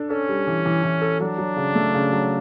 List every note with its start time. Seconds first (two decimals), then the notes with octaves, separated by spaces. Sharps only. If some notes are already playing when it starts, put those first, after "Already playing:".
Already playing: D4 A4
0.10 C#4 A4
0.29 G3
0.47 E3
0.66 E3
0.84 E3
1.02 A4
1.20 F#3 D4
1.38 F#3
1.56 C#3
1.75 A3
1.94 C#3
2.12 F#3